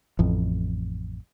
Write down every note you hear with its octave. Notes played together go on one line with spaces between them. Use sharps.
A1 F2